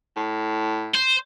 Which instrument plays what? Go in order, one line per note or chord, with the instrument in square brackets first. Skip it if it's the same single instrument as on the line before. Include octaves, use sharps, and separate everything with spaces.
[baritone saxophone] A2
[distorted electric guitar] C5